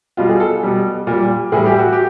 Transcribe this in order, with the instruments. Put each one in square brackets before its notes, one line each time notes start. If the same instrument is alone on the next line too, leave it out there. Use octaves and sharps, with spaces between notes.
[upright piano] B2 G3 F4
G#4
A4
B2 G3
A#2 G3
A2 E3 G3 G#4
G4
F#4
G4